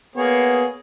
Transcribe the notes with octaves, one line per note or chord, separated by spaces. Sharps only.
A#3 B3 G#4 C#5